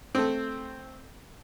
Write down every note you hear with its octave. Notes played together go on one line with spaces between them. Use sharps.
A3 C4